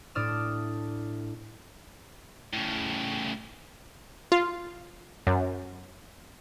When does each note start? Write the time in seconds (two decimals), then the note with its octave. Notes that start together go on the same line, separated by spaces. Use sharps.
0.15 A2 D4 D5 D#6 F6 E7
2.53 A2 C#3
4.32 F4
5.27 F#2